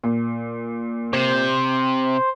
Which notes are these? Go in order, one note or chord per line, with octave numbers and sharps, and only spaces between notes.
A#2
C3 C5